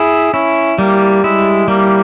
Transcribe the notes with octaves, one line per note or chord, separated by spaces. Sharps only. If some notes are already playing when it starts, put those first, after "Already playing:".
Already playing: E4 G#4
C#4 E4
G3 A#3
G#3 E4
G3 A#3